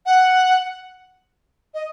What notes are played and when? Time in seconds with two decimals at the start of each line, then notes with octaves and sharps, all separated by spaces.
0.06 F#5
1.74 D#5